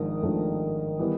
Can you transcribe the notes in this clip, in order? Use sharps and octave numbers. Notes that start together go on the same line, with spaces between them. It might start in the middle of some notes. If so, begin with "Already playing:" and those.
Already playing: G#1 G#2 D#3 F3 D4
G#1 G#2 F3 A3 D4
E3 G3 B3